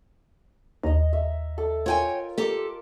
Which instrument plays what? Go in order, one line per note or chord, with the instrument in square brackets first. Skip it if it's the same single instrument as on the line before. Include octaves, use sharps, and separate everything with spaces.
[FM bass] D#2 [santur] D#5 A#5
[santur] E5
A4
[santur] F4 A#4 [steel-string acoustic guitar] C#5 G5 G#5
[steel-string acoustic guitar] G4 A4 [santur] A#4 D6